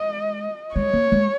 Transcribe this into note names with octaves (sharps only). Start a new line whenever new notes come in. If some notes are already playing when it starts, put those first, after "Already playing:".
Already playing: G#3 D#5
G#3 C#5
A#3
G#3